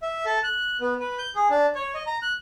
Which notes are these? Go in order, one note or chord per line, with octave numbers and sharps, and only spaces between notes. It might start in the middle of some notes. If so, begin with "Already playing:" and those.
E5
A4
F#6
B3
B4
G6
G#4
D4
C#5
D#5
A#5
F#6